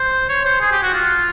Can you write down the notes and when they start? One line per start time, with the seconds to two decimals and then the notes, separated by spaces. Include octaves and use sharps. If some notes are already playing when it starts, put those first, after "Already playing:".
Already playing: C5
0.29 C#5
0.45 C5
0.61 G#4
0.72 G4
0.83 F#4
0.93 F4